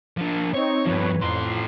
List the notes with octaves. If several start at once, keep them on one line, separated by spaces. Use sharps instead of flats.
F3 D4
C4 D#4 C#5 C#6
G2 F3 B4 C#5
F2 A2 C6 C7